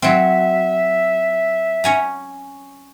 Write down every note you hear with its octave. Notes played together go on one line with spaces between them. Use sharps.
F#3 C4 E5
C#4 G#5 A#5